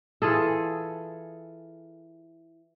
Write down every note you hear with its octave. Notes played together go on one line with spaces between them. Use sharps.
E3 F4 G#4 A4